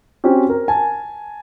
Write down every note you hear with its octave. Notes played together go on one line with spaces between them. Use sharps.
C4 C#4 F#4 G4
A#4
G#5 A5